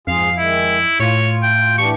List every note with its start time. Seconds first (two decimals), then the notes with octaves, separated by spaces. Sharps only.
0.07 F2 G#2 F4 G#4 F5
0.38 D#3 G#3 E4 E5
1.00 A2 F4 C#5
1.43 G5
1.78 E3 D4 G4 C#6